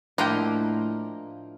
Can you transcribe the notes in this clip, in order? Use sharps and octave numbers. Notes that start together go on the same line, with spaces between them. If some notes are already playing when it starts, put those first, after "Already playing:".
A2 F3 A#3 D4 E4 D#5 G5